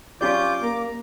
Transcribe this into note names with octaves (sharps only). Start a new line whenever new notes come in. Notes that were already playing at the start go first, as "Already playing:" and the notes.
C#4 F4 G4 D5 D6 G6
A#3 A#5